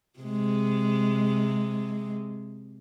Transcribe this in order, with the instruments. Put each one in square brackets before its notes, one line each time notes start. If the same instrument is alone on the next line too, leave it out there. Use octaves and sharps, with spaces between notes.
[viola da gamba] C3 G#3